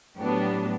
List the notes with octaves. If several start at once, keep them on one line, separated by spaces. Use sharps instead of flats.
A2 F#3 B3 D4 G4